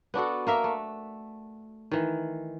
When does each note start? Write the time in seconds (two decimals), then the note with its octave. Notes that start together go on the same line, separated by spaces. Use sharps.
0.14 B3 D4 F#4 A4
0.47 A#3 A#4 E5
0.64 A3
1.91 D#3 E3